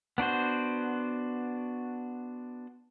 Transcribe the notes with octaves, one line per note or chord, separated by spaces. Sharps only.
B3 D4 F#4 C5